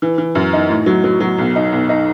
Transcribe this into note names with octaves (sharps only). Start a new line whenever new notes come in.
E3
E3
F#2
D#4
A2
F#3
F#3
F#3
B1
D#4
B1
D#4